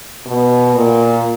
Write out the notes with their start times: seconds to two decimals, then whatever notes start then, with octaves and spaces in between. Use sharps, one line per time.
0.26 B2
0.75 A#2